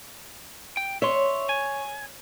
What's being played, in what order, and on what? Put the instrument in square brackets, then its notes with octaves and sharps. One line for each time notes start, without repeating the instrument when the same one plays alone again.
[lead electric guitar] G5
[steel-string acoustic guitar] C#5 [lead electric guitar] E5 C6
[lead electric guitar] G#5